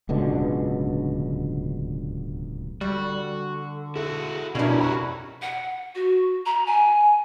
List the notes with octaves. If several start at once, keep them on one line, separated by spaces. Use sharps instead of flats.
D1 C#2 B2 D3
D3 G3 F#4
E4 F#4 G#4 A4
B2 F3 C#4 D4 E4 A#4 G#6 F#7
C3 F#4 A4 B5 C#6
F#5
F#4
A#5
G#5